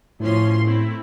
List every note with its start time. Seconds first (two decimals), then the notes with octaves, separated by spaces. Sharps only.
0.20 A2 F3 C#4 C6
0.65 A3 C4 E4